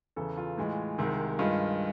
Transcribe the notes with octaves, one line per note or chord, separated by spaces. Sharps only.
E2 C#3 E3 A4
F4
A2 E3 G#3
C2 C3 D#3 G#3
G2 D#3 G#3 F4